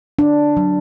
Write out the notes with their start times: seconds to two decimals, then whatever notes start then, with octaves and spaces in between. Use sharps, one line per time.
0.19 D4
0.57 F#3